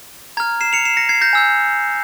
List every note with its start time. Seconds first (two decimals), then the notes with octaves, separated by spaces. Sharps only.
0.37 A#5 G#6
0.40 F6
0.61 C7 E7
0.73 C#7 F7
0.85 C7 E7
0.97 A#6 C#7
1.09 G#6 C7
1.21 G6 A#6
1.33 G#5 E6 G6